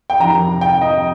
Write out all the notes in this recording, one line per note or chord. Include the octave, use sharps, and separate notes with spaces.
G5
F2 C3 D#3 A#5
G5
D#5